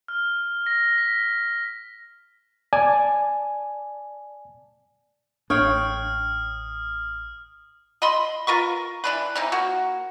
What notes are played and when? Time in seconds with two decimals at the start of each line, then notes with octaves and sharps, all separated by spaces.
0.08 F6
0.66 A#6
0.98 B6
2.73 D5 G#5 A5
5.50 A1 D4 C#5 F5 G5 D#6 F6
8.02 D#5 B5 C6
8.47 F4 A#4 B4 C#6
9.04 E3 D4 B4
9.36 E3 C4 D#4
9.52 A#3 F#4